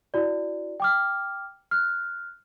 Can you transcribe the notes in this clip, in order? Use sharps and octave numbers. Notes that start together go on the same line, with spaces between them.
E4 F#4 D5
G5 D6 F6
F6 F#6